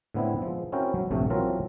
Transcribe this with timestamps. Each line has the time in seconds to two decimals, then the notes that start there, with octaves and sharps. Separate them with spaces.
0.14 A2 D3 B3 C4 E4
0.42 F3 G#3
0.72 C4 C#4 E4 F#4 A#4 G5
0.94 F#3
1.11 A#1 G2 C3 A3
1.30 E3 F#3 C4 F4 A4 A#4